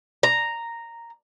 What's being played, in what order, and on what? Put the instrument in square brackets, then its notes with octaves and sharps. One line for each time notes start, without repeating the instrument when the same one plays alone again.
[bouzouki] A#5